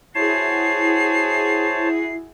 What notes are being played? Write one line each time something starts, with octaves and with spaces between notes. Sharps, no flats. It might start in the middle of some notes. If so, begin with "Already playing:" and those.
E4 F#4 G#4 C5 C#5 A5 C7